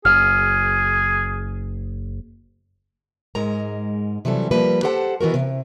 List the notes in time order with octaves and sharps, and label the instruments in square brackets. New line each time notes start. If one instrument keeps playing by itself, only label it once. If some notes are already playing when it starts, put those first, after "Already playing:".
[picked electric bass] F#1 [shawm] G#4 [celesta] F6
[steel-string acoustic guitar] G#2 G#3 A#4 A#5
C3 E3 F#3 G3 A4
F3 G3 A#3 B4
G4 A4 C5 F#5 G#5 A5
D#3 E3 B3 F#4 A#4
C3